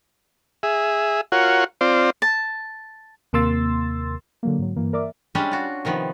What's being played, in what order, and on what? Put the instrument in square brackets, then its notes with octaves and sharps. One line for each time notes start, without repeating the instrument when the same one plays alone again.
[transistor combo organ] G#4 E5
F4 F#4 A#4 C#5 F#5
C4 F4 C5 D5
[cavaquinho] A5
[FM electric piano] D#2 C3 A#3 C6 E6 A6
[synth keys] D3 F#3 A#3
G#2 F#3
G2 E3 A#3
A#4 D5 E5 D6
[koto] G3 G#3 C#4 D4 G4
F4 F#4
C3 D#3 F3 B3